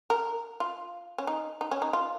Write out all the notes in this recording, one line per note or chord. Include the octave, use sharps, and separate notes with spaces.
A#4
F4
C#4
D#4
D#4
C#4
D#4
F4